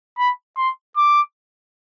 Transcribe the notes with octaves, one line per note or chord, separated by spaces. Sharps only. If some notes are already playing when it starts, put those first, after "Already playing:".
B5
C6
D6